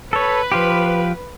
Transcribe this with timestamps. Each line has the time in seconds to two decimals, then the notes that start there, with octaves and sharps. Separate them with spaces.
0.13 A4 B4 C#5
0.52 F3 F4 G4